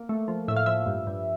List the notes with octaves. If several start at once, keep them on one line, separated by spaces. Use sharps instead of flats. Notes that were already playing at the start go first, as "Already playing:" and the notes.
Already playing: A#3
A3
F3
A2 E5
F5
F3 E5
G2
G2